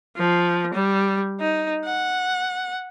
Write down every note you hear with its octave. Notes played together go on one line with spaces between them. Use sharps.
F3
G3
D#4
F#5